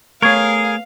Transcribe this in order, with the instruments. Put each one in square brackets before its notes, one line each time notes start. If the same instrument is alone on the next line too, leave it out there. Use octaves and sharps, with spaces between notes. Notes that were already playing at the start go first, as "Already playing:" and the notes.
[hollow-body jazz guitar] A3 B3 C#5 [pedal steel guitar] G#4 A#4 [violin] F5 [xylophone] C#6 G#6